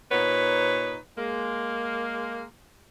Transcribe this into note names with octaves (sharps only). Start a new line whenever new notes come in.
A#2 D#4 B4 C#5
G#3 A#3